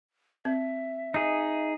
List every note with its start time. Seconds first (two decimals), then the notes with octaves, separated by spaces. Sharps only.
0.45 C4 E5
1.14 D#4 G#4 D#5